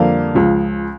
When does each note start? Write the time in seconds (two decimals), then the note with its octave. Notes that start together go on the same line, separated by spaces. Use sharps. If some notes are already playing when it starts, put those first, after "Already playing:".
Already playing: F2 D3 G3 A#3 F5
0.35 C#2 C#3 F3